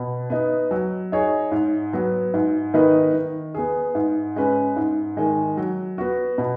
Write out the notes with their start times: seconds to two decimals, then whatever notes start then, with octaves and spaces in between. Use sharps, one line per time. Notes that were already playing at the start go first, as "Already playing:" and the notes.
Already playing: B2
0.30 B3 D#4
0.71 F#3
1.12 D#4 G#4 C#5
1.52 G#2
1.93 F#3 B3
2.34 G#2
2.74 D#3 B3 D#4 B4
3.14 D#3
3.55 B3 G#4
3.95 G#2
4.36 G#3 C#4 B4
4.76 G#2
5.17 D#3 G#3
5.57 F#3
5.98 B3 F#4
6.38 B2